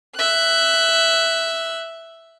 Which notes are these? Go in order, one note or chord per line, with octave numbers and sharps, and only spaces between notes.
E5 F#6